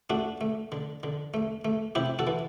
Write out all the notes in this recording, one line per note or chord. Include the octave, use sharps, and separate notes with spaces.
A3 D4 F#4
A3
D3
D3
A3
A3
C3 E4 G4
F#4 A4
E3